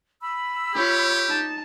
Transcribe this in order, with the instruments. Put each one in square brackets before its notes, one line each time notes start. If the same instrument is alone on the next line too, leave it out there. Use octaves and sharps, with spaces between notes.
[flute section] B5 E6
[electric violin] F4 C#5 [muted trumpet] G4
[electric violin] D#4 A5